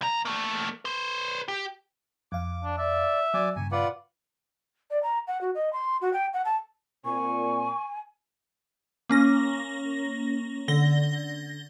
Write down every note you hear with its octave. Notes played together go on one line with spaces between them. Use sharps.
C2 A#5
A3 A#3
B4 C5
G4
F2 F5 D6
D4
D5 E5
F#3 D5 G#5 D6
G2 A#2 C#3 G#5
F4 B4 D5 F#5
D5
A#5
F#5
F#4
D#5
C6
F#4
G5
F#5
A5
A#2 C4 G#5 C#6
A#3 C#4 A#6
D3 A#6 G7